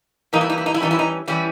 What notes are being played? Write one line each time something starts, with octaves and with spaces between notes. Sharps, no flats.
E3 G3 A#3 D#4
E4
D#4
E4
D#4
E4
E3 G3 C#4 D#4
E4
D#4
E3 G3 C#4 E4